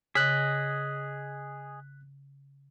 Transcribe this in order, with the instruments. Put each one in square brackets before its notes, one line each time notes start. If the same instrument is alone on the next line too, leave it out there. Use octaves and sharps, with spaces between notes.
[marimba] C#3 [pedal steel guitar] G#4 D#5 [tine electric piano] F#6 B6